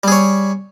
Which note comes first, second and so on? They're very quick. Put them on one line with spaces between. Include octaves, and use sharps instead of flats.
G3 G#4 C#5